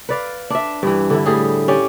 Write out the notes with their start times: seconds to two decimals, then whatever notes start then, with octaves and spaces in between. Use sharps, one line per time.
0.09 B4 D5 F5
0.50 D4 E5
0.83 G2 E3
1.10 D3 E4
1.26 A2 G3 G#4
1.68 C#4 G4 D5